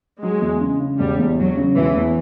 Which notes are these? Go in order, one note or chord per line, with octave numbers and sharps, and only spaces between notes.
F#3 G#3
E2
C#3
C#3
E1 G3
E2
E1 F#3
C#3
E1 E3
E2